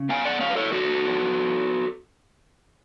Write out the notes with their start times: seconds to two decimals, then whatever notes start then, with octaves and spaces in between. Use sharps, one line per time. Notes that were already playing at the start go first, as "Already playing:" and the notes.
Already playing: C#3
0.09 B3 F5 G#5
0.25 D5 F#5
0.41 F#3 C#5 F5
0.50 B4
0.56 A4 C#5
0.72 D4 F#4 A4
1.05 B3